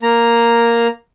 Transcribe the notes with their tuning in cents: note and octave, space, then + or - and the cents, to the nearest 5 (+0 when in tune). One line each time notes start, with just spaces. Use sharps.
A#3 +0 A#5 +0